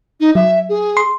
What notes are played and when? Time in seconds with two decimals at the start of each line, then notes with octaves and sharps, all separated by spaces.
0.20 D#4
0.35 F#3 E5
0.69 G#4
0.97 C6